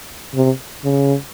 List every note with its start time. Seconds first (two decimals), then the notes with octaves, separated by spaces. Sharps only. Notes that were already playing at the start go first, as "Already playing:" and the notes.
0.35 C3
0.84 C#3